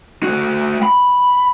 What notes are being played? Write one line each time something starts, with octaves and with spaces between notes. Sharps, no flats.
A3 F#4
B5